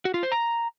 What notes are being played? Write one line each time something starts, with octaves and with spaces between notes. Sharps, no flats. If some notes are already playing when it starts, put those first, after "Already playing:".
F#4
F4
C5
A#5